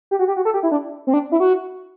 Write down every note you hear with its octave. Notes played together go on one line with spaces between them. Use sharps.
G4
F#4
G4
F#4
A4
G4
E4
D4
C4
D4
E4
F#4